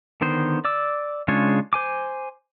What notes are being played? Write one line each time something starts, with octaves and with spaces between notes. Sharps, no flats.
D3 D#3 B3 C5
D5 D6 E6
C#3 G#3 D4 F4 C#5
C5 G#5 D6